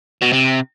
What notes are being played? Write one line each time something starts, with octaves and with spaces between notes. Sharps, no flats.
B2
C3